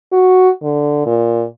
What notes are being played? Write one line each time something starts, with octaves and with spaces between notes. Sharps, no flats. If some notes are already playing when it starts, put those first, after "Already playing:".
F#4
D3
A#2